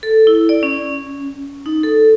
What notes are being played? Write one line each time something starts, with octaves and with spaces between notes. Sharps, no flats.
A4
E4
D5
C#4
D#4
A4